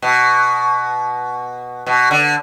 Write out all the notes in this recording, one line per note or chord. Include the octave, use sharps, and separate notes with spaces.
B2
B2
D3